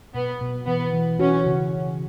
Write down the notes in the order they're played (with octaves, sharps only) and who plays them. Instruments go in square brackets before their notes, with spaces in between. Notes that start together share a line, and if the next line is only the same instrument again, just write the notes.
[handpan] B2 [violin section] B3
[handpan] B2
[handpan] E3 [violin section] B3
[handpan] E3
[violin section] C#4 [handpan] F#4
[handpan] C#3